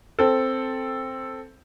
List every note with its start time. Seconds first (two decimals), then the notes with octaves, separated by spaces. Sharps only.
0.19 C4 A4